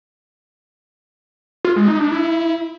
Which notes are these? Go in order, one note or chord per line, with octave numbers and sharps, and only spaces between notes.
F4
G#3
D#4
D4
E4